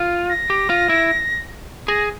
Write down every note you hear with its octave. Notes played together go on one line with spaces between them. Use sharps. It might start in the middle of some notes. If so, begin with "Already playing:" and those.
Already playing: F4
A#6
G4
F4
E4
G#4 A#6